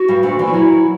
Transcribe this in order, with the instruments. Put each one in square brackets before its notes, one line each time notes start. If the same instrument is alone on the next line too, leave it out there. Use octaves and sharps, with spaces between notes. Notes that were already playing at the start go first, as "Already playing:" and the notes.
Already playing: [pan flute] F#4
[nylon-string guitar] G2 G3
D2 D3
E2 E3
[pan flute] F#4
[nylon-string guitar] F#2 F#3 [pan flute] E4